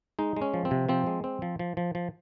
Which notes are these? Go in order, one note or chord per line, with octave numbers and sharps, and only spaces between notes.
G#3 D#4
G#3
C#4
F3
C4
C3
F3 C4
G#3
C4
F3
F3
F3
F3